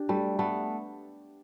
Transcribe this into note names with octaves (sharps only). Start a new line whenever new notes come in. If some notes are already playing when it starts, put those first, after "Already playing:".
Already playing: D4 G4
G3 A3
A3 B3